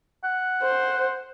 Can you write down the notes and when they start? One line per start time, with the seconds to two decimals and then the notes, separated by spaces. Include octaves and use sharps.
0.24 F#5
0.62 C5